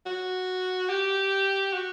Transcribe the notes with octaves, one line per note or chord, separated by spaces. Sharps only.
F#4
G4
F#4